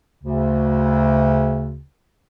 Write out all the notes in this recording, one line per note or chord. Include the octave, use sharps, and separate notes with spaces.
D2 C#3